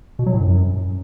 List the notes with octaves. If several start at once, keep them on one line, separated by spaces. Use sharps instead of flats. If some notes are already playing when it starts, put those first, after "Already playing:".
B2
F#3
A2
F#2